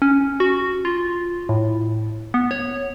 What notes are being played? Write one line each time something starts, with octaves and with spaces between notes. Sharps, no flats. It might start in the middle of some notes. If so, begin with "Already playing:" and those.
C#4
F#4
F4
A2
B3
C#5